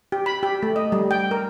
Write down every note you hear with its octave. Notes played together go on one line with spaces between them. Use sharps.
G4
B5
G4
A3
D#5
G3
G5
A#4